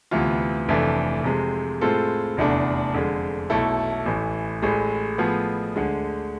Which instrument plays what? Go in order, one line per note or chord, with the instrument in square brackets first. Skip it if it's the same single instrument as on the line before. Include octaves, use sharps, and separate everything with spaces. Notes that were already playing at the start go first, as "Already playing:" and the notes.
[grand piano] D2 C3 E3 B3 F4
F1 F2 E3 A3 D4
F2 C3 G#3
A2 G#3 C4 F4 A4
F1 E2 D3 A3 D4
F2 D3 G#3
B1 B2 A3 E4 A4
A1 A2 E3
A1 A2 G#3
A2 F3 B3 F4 G#4
D2 D3 G#3